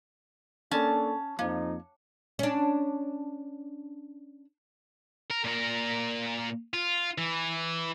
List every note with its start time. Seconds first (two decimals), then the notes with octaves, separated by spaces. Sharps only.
0.71 A#3 C#4 D4 A4 A5
1.39 F2 F3 A#3 D#4
2.39 C#4 D4
5.30 A#4
5.44 A#2 A#4
6.74 F4
7.18 E3